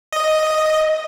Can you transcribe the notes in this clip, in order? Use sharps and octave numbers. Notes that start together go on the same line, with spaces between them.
D#5